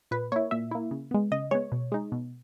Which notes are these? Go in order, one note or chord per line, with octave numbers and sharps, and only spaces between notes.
A#2 B4
A#3 E4 C#5
A#2 E5
A#3 E4
C#3
G#3 B3
C#3 D#5
G#3 B3 C#5
B2
G#3 D#4
B2